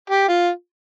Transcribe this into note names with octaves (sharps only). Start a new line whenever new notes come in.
G4
F4